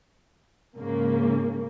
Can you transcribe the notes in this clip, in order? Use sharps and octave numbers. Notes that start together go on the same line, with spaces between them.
G#2 C#3 A#3